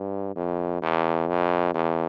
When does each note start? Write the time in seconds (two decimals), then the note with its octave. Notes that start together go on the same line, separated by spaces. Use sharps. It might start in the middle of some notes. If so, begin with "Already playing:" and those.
Already playing: G2
0.36 F2
0.82 E2
1.29 F2
1.74 E2